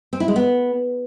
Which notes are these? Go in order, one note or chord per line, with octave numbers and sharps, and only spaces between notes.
C4
E4
G#3
B3